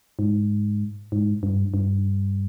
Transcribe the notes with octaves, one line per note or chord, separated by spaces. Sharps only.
G#2
G#2
G2
G2